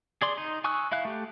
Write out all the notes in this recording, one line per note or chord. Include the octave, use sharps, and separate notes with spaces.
G#4 D5 C6
D#4
G#5 C#6 D#6 E6 F#6
E4 E5 F5 F#6
A3 G4